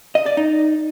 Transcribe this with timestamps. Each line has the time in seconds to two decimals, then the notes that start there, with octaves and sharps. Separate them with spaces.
0.15 D#5
0.26 D5
0.37 D#4